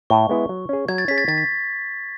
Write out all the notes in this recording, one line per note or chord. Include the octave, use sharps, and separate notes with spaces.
A2 C#6
G#3 B3 E4
F#3
C#4 G#4
F#3 G#6
A6
C#4 G#4 B6
A6
D#3 A6
B6